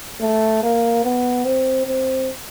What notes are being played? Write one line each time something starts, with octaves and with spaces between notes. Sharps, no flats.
A3
A#3
B3
C4
C4